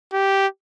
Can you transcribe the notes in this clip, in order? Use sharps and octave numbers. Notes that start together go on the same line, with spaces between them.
G4